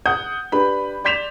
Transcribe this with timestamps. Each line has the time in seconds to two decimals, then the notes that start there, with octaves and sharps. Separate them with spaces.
0.06 F#5 D#6 G6
0.52 D4 G4 B4 B5
1.04 D5 C6 G6 B6 E7 F7